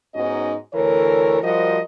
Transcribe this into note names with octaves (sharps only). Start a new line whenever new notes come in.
G#2 B3 C#4 D#4 F#4 D#5
D2 E3 A4 A#4 C#5
F3 G3 F#4 A#4 C5 D#5